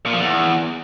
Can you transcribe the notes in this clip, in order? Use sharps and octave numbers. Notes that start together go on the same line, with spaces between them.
A#2
F3
E2